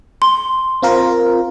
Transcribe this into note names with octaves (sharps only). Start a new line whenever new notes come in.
C6
C4 F4 A#4